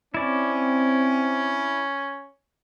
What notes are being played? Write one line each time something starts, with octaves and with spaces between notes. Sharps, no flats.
C4 C#4 E4 D5